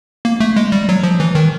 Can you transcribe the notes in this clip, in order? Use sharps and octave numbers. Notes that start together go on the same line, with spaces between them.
A#3
A3
G#3
G3
F#3
F3
E3
D#3